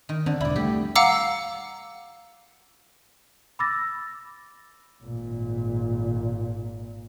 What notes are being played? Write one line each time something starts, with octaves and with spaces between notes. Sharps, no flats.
D#3
D3 C4
E1 D#2 E4 D5
G3 A3 G4
F5 F#5 A#5 D6 E6
B5 D6 E6 A6 A#6
G#1 A#2